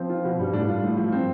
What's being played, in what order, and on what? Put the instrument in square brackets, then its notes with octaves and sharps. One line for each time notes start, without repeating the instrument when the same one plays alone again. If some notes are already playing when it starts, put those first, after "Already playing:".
Already playing: [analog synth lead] F3 [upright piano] C4
[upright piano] F4
B2
[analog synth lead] G2 [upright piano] G3
[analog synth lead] A2 [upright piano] D4
[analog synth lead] G2 [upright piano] F4
[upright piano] A2
F3
C4